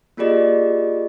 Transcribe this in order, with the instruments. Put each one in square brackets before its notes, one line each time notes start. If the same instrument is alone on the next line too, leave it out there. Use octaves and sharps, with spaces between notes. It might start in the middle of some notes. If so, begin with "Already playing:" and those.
[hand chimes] A#3 F4 G4 G#4 D5 D#5